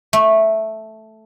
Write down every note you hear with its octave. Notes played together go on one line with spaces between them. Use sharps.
A3